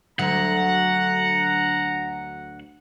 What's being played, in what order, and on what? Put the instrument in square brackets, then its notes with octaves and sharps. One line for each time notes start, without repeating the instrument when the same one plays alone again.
[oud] D2 D3 F#3 [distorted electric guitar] F#5 [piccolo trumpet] A#5